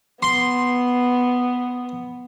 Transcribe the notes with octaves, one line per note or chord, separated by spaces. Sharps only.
B3 C6